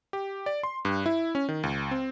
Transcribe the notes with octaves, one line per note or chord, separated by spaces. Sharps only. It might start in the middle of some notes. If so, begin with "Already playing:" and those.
G4
D5
C6
G2
E4
C#4
D#3
C#2
C4